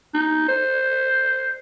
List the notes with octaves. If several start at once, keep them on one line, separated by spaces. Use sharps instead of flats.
D#4
C5